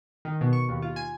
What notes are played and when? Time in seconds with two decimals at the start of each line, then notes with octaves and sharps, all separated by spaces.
0.25 D#3
0.41 B2
0.53 C#6
0.69 D#2
0.82 F4
0.96 G#5